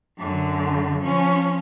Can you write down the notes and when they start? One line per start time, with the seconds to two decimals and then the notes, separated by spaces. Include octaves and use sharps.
0.18 F#2 D3
1.02 F3 C#4